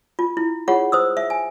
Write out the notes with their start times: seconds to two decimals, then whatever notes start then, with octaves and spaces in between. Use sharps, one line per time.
0.19 F4
0.37 E4
0.68 F4 G#4 C#5 F#5
0.92 C5 D#6 E6
1.17 E5
1.30 G#5